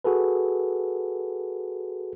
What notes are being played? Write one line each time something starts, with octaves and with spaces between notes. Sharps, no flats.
F#4 G#4 A4 B4